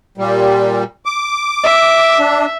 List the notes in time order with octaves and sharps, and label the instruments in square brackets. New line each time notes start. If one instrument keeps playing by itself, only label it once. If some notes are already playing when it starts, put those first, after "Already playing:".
[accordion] A#2 G3
D6
[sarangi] E5
[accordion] D4